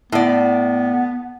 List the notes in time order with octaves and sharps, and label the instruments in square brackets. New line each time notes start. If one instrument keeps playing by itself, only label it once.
[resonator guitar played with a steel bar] A2 D5 [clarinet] B3